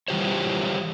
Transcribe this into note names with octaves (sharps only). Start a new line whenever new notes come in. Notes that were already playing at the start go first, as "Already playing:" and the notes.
E3 G3 F4 G4 C5 C#5